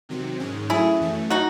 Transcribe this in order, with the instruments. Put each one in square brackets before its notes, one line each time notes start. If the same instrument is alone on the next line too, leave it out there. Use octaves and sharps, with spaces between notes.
[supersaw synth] C3 D#3 F#3 C4
G#2 D#3 G#3 C#4
[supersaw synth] F#3 A3 C#4 [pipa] E4 G#4
[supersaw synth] F#2 E3 A3 C#4
[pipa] D#4 F#4